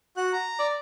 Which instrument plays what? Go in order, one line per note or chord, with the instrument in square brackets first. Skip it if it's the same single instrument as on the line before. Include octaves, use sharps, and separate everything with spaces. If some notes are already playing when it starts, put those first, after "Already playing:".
[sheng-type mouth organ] F#4 F#6
A#5
[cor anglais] D5